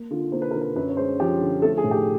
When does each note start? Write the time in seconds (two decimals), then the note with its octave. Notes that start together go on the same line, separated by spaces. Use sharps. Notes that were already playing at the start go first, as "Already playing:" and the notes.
Already playing: A#3
0.11 D3 F4
0.32 A#3 C5
0.42 B4
0.51 D3 A#4
0.61 B4
0.76 F#2 B4
0.89 C#5
0.97 G#3 C5
1.19 F3 G4
1.41 D3
1.62 A3 A4
1.77 G#4
1.84 A2
1.91 G4